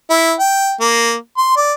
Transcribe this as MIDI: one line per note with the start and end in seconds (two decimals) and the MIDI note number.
0.10 0.33 64
0.40 0.74 79
0.80 1.15 58
1.37 1.56 84
1.57 1.73 74